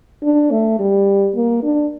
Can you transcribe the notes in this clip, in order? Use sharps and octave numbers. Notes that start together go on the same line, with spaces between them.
D4
A3
G3
A#3
D4